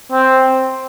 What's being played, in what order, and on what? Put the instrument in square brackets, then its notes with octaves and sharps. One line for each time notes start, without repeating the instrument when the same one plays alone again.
[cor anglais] C4